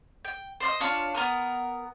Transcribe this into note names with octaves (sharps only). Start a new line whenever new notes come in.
G5
C5 D5 D#5
D4 F4 C#5 D5
B3 A#4 D#6